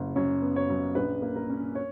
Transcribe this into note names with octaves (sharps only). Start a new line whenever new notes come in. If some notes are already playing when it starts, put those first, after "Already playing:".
Already playing: F#1
F#2 C#5
B3
C#5
F#2
A#1 B4
A#3
A#4
C#4
C#5